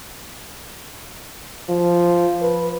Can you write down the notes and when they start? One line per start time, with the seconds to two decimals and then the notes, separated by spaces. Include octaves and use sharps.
1.70 F3
2.42 B4